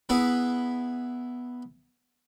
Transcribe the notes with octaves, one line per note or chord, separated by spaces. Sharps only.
B3 E4 G#4 B4